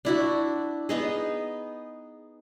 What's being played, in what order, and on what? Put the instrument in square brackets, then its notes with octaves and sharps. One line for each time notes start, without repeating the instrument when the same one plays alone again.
[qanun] D4 E4 F#4
B3 D#4 G#4